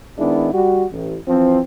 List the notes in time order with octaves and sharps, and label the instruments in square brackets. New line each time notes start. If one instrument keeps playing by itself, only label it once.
[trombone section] D#3 G#3 B3 D4 E4
G3 F#4
A1
E3 F3 C4